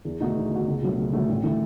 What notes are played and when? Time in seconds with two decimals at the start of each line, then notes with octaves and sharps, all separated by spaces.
0.05 E2
0.20 B2 A3 D#4 F#4
0.36 E2
0.51 B2 A3 D#4 F#4
0.67 C#2
0.82 B2 F#3 A3
0.97 C#2
1.13 B2 F#3 A3
1.28 A1
1.44 E3 A3